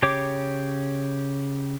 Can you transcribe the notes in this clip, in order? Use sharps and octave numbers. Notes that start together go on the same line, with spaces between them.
C#3 G4 C#5 D6